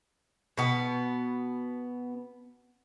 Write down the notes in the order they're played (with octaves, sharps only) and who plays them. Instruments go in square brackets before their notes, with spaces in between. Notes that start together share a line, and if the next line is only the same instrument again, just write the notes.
[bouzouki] B2 B3